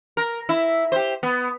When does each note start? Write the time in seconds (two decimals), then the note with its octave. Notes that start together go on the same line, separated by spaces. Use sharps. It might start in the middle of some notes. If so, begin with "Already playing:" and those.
0.17 A#4
0.49 E4
0.92 G4 C5
1.23 B3